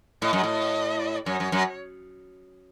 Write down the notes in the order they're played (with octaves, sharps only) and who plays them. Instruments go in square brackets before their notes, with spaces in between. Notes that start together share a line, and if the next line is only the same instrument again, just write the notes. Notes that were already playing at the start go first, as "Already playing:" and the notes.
[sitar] A2 [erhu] D#5
[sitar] F#2
A2
[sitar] F#2 [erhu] C#5
[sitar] F#2
F#2